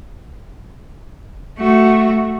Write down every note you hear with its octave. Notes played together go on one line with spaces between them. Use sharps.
A3 F#4